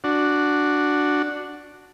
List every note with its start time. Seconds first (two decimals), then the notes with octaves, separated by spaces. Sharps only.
0.04 D4 F#4